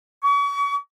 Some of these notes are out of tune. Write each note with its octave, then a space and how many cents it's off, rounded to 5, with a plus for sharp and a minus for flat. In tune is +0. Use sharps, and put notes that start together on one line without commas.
C#6 +40